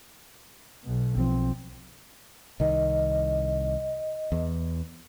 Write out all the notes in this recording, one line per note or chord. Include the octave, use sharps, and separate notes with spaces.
B1 B2
B1 F3 C4
C2 D#3 D#5
E2